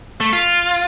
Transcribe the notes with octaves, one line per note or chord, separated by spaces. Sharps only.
A3
F4